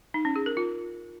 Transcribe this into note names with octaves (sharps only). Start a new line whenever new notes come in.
D#4
C#4
G#4
A#4
F4